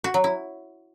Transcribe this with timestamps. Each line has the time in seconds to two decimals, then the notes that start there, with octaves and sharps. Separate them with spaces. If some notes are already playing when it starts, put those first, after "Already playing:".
0.04 F#4
0.14 F#3
0.24 E4